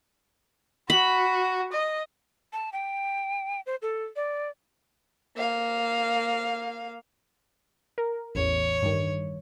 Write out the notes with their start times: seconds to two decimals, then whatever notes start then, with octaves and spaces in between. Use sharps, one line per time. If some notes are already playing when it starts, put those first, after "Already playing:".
0.90 F#4 B5
1.73 D#5
2.53 A5
2.73 G5
3.66 C5
3.82 A4
4.16 D5
5.37 A#3 F5
7.98 A#4
8.35 A1 E2 C#5
8.83 G2 D#3